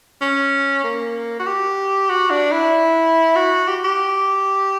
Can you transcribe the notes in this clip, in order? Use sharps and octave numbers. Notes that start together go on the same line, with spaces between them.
C#4
A#3
F#4
G4
F#4
D4
E4
F#4
G4
G4